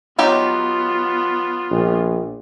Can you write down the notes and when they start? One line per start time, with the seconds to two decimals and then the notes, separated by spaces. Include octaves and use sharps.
0.19 F#3 B3 D#4 F4 G4
1.71 A#1